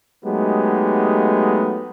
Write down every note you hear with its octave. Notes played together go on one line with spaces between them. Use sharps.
F#3 G#3 A3 B3 D#4 G4